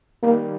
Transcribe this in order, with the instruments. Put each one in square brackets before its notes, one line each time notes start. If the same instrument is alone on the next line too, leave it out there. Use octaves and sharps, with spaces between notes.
[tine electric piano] D#3 G3 [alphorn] A#3